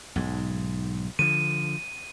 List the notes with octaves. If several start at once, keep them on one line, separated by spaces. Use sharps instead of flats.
B1 G#2
D3 F3 D#7